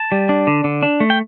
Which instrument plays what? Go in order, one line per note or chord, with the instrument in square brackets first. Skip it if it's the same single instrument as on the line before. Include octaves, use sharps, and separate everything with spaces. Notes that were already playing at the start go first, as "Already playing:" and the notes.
Already playing: [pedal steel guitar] A5
G3
D4
D3
D3
D4
A3
G5